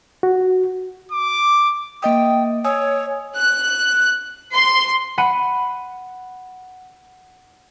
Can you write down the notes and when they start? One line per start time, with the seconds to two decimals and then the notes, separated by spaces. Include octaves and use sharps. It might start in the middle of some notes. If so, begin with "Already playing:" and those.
0.23 F#4
1.12 D6
2.03 A#3 D#5 G5 D#6
2.65 C#5 G#5 D#6 E6
3.36 F#6
4.54 C6
5.18 F#5 B5 C#7 D#7